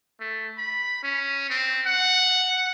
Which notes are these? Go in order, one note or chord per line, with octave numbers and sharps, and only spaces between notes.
A3
B5
C#4
C4
F#5